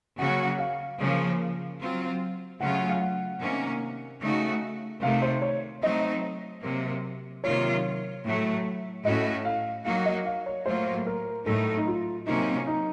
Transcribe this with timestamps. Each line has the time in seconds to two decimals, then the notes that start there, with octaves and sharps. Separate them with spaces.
0.18 C#3 F#3 A#3 C#4 F#4 F#5
0.59 F5
1.00 C#3 F3 A#3
1.80 F#3 C4 F4
2.60 C#3 F#3 A3 C#4 F4 F#5
2.90 F5
3.01 F#5
3.41 C3 D#3 A#3 C#4
4.22 C#3 A3 D#4 F#4
5.02 C3 D#3 A3 F5
5.22 C5
5.42 C#5
5.82 F#3 A3 C4 D#4 D#5
6.63 C3 F#3 A#3
7.44 C3 D#3 F#3 A#3 F4 C#5
8.25 A2 F#3 A3
9.05 A2 A3 C#4 F#4 D#5
9.45 F5
9.85 F#3 A#3 D#4 F#4 F5
10.06 D#5
10.26 F5
10.46 C#5
10.66 A2 F#3 A#3 F4 C5
11.07 A#4
11.46 A2 F#3 A3 D#4 A4
11.77 D#4
11.87 F4
12.26 C3 F#3 A#3 C#4 D#4
12.67 D#4